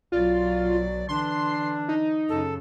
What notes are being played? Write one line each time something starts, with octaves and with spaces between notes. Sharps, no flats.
B1 F#3 F4 D5
D3 E3 D4 C6
D#4
F#2 C#3 A4